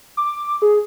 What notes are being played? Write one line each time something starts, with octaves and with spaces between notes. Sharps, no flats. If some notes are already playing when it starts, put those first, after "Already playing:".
D6
G#4